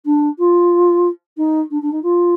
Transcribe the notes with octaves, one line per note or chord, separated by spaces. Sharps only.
D4
F4
D#4
D4
D4
D#4
F4